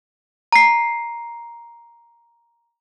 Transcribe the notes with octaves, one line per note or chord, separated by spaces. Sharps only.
A#5 C7